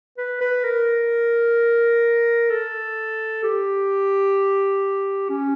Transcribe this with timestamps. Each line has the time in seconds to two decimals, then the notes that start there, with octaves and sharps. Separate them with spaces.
0.18 B4
0.41 B4
0.64 A#4
2.50 A4
3.44 G4
5.29 C#4